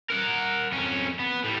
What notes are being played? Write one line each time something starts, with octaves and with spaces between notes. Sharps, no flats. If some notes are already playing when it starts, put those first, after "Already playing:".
A#4 F#5
F2 C#4
B3
A2 G3